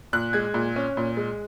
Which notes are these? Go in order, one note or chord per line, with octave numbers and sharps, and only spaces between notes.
A#2 F#6
G#3 G#6
A#2
C#4
A#2
G#3